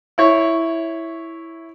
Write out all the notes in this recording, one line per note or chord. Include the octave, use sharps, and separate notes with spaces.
E4 C#5